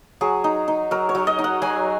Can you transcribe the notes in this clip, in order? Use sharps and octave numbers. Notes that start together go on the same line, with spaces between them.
F#3 G#4
D#4
D#4
F#3 A#4
C#5
F#3
D#5
D#4
F#5
F#3 G#5